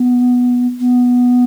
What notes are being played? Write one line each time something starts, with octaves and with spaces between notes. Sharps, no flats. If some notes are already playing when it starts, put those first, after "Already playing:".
Already playing: B3
B3